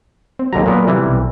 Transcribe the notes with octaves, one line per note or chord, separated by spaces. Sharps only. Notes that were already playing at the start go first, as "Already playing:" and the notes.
C4
D#2 D3 F#3 A#5
A#2 B3 A#4
C3 E3 G3
B1